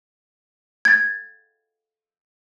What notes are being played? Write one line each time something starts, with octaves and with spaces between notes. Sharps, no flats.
G#6 A6